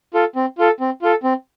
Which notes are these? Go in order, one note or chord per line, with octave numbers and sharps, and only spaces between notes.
F4 A4
C4
F4 A4
C4
F4 A4
C4